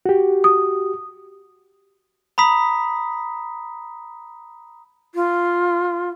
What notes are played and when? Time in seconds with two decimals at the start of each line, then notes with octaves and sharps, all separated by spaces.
0.06 F#4 G4
0.44 D#6
2.38 A#5 B5 D#6 B6
5.15 F4